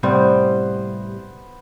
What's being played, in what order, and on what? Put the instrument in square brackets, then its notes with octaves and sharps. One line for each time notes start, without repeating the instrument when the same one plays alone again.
[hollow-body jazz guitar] A2 C3 G3 [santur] B3 C5